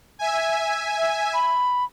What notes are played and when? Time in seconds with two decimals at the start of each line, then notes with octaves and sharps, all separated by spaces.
0.19 E5 G#5
1.34 B5